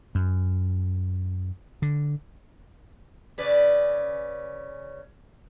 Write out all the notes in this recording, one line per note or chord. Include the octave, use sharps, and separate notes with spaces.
F#2
D3
C#3 B4 D5